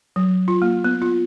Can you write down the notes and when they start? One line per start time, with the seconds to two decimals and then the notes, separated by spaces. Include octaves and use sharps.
0.16 F#3
0.48 F4
0.62 A#3
0.84 B3
1.02 F4